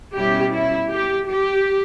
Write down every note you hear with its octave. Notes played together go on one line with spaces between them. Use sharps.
B2 G3 C#4 E4 G4
E4
G4
G4